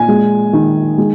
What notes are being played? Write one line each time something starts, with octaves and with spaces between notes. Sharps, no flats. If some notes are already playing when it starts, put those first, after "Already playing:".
Already playing: A#2 G#5
G#3
D#3
G#3